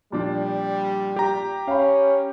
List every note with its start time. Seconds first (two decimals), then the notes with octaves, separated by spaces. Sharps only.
0.12 A#2 F3 G3 D4
1.16 G4 A#5
1.68 C#4 F5 B5